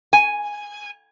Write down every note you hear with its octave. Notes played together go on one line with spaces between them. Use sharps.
G#5